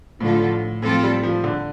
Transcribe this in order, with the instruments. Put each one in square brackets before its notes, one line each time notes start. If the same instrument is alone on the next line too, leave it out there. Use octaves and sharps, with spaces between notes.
[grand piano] A2 [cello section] D3 F3 A3 F4 A4
[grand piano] A2 [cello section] F3 C4 F4 A4
[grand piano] G3
F3
D3